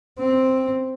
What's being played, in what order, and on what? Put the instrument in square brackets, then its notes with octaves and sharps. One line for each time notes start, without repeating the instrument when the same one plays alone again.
[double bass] C4